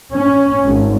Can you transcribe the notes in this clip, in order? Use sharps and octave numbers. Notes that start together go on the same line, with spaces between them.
C#4
G#1